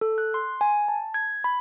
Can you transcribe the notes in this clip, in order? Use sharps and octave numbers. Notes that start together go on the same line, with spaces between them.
A4
F#6
C6
G#5
A5
G#6
B5